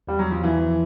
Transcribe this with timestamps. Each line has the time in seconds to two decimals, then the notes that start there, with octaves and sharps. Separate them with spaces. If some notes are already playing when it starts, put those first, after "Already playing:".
0.07 E2 G3
0.19 F#3
0.31 E2 F3
0.43 E3
0.54 F3